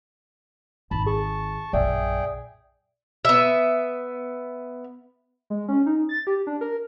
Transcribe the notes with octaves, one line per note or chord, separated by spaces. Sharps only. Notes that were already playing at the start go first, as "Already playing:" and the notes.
G#1 A5 B5
G#4 A5 C#6
A#1 F#2 G#4 D5 E5 G5
B3 E5
G#3
C#4
D#4
A6
G4
D4
A#4